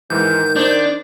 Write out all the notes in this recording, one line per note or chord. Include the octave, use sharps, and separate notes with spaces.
G#2 D#3 E3 G6
D4 D#4 C5